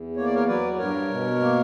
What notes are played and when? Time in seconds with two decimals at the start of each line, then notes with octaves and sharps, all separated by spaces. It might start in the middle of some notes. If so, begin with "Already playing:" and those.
Already playing: E2
0.16 A#3 C#5
0.25 D5
0.35 A#4 C#5
0.47 F#3 B4 D5
0.78 G2 A#4 C#5
1.10 B2
1.41 A#3